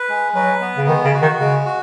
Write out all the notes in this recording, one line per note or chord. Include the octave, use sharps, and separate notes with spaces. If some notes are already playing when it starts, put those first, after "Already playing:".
Already playing: B4
G#3
F#3 B4
B3
C#3
D#3 G#3
C#3
F#4
D#3
C#3 G#3
F#4